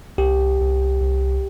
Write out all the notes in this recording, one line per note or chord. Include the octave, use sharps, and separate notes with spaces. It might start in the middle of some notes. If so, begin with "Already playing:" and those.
C2 G4
C2
C2